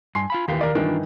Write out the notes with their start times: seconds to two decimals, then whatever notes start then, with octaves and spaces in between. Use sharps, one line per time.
0.15 G2 G#5 C6 C7
0.30 F4 F5 B5
0.48 D#2 D#3 E3 G4 F5
0.61 A#4 D5
0.75 G2 D#3 E3 D4 F4